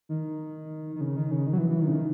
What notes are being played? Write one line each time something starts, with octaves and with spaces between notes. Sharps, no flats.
D#3
D#3
C#3
D#3
C#3
D#3
F#3
E3
E3
D#3
C#3
D#3